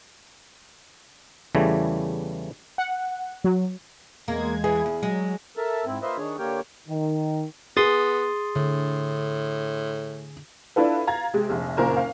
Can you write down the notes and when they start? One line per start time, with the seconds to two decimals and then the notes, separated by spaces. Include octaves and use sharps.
1.55 E2 C#3 E3 G3 A3
2.78 F#5
3.44 F#3
4.28 E2 G#3 A#3 G#6
4.64 E3 G#4
4.86 E2
5.03 F#3 G#3
5.57 A4 A#4 E5 A5
5.86 G#2 C4 E4
6.02 A#3 F4 B4 C5 D#5 E5
6.17 D#3 D4 G#4 C#5
6.38 D3 A#3 G4 A#4 C#5 G5
6.88 D#3
7.77 B3 G#4 C6 D#6 A6
8.56 A2 D3
10.76 D4 E4 F4 A4 B4
11.07 F5 A#5 G#6 A6
11.34 C3 G#3
11.49 F1 A#1
11.77 F#1 A#2 A#4 C5
11.96 F5